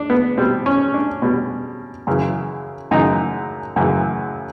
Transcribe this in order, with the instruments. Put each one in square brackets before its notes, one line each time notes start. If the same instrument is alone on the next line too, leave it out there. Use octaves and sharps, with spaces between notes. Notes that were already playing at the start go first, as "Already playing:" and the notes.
Already playing: [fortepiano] D4
B3
B2 G3 C4
C#4
D4
B2 G3
F#2 C#3 E3
F#2 C#3 E3 D#4
F#2 C#3 E3